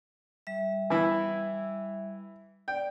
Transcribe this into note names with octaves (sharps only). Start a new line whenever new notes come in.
G3 E5
E3 E4
D5 G5